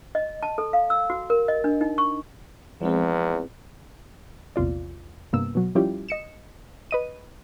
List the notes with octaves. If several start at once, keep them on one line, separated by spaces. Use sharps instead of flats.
D#5
A5
A4
F5
E6
F#4
A#4
D#5
D4
D#4
C#6
E2 F3 G#3 C4
A#1 E2 C3 F4 D5
G2 C3 A#3 B3 E6
B2 F#3
F3 G3 C#4 E4 F4 G4
D#5 C#7 E7
B4 D#5 D#7